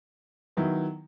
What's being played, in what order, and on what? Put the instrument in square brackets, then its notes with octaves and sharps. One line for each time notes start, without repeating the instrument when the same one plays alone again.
[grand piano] D#3 F#3 B3 E4